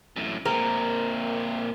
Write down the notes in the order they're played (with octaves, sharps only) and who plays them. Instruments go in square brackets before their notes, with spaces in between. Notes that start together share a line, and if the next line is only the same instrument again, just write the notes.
[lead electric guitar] F#2 A2
[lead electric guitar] A#2 C4 [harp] A#4